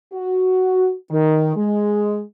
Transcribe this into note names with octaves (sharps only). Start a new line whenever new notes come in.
F#4
D#3
G#3